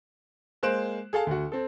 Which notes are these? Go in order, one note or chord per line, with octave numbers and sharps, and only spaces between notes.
G#3 A#3 C5 F#6 D7 E7
G#4 A4 F5 A5
D2 F#4
C4 A4